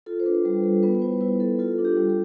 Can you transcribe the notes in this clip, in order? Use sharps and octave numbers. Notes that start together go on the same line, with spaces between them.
F4 A4
C5
D4 B4
G3 A4
G3 A4
B3 B4
B4
E4 C5
E4 B4
B3 A4
F4 A4
D4
G4
G3
A4